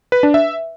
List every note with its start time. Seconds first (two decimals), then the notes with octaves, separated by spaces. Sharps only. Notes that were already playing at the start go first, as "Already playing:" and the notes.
0.12 B4
0.23 D4
0.34 E5